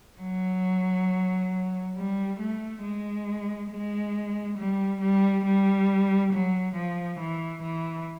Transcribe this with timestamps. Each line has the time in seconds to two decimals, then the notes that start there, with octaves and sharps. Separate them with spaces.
0.21 F#3
1.96 G3
2.40 A3
2.83 G#3
3.71 G#3
4.58 G3
5.01 G3
5.45 G3
6.33 F#3
6.76 F3
7.19 E3
7.62 E3